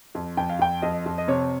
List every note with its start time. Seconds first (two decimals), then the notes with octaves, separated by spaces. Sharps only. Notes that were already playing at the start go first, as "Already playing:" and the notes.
0.15 F2
0.37 F2 G5
0.50 F5
0.59 F2 G5
0.82 F2 D#5
1.06 F2
1.18 D#5
1.28 C3 C#5